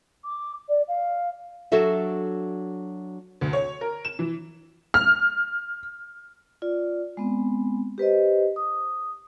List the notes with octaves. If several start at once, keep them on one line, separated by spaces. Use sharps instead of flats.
D6
D5
F5
F#3 D4 F#4 A4 E5
D2
C#5
A#4
E7
E3
F6
F4 D5
G#3 B3 C4
G4 B4 C5 D#5
D#6